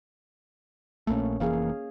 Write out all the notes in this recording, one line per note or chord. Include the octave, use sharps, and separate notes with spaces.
A#1 A3 A#3 C#4
F1 E3 A#3 G#4 F5